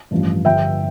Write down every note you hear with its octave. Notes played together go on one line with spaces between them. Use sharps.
A1 G2 F3
G1 G2 F3 E5 G5